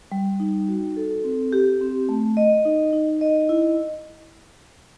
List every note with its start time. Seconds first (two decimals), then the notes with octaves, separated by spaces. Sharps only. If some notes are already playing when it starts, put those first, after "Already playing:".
0.12 G3
0.40 D#4
0.68 F#4
0.97 A4
1.24 C4
1.52 G4
1.81 C4
2.09 A3
2.37 D#5
2.65 D#4
2.93 D#4
3.21 D#5
3.49 E4